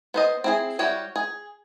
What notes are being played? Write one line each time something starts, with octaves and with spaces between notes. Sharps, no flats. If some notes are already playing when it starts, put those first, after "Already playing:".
B3 C5 D#5
C4 E4 G#4
G3 E4 F#4 C#5 G5
G#4